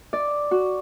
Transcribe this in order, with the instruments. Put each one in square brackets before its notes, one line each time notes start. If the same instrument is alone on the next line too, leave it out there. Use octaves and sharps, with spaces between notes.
[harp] D5
F#4